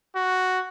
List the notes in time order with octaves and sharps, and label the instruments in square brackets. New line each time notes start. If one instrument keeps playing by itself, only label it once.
[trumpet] F#4